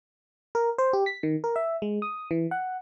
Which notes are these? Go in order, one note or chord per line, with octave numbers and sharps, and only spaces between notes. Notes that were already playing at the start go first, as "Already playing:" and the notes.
A#4
C5
G4
B6
D#3
A#4
E5
G#3
D#6
E3
F#5